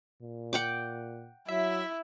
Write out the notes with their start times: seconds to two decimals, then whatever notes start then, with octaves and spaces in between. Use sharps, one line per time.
0.23 A#2
0.53 F#5 G5 D6
1.48 F#3 E4 E5